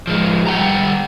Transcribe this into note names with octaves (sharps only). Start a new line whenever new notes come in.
F3 G#3
G3 F#5 G5 A#5